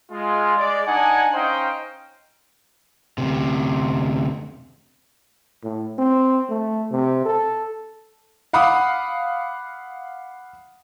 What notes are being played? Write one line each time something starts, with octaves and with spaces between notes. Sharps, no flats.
G#3 F4
G#3 D5
D4 D#4 F#5 G#5
C#4 D#4 C5 D#5 F5 G5
D2 C3
A2
C4
A3
C3
A4
F5 F#5 B5 D6 D#6